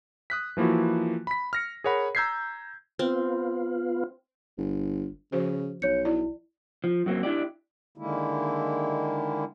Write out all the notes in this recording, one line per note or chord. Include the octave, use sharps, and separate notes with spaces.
D#6 F#6 B6
E3 F3 A#3 E4 F#4
B5 B6
F6 A#6 C#7
G#4 A#4 C#5 F#5 B5
A#5 E6 G6 G#6 B6 C7
B3 C4 F4
G1
C#3 F3 F#4 C5
B1 C#5 G6 C#7
E4 D5
F3
F#2 F#3 A#3 C4
D4 E4 G4 D5
D3 D#3 G#3 A#3 E4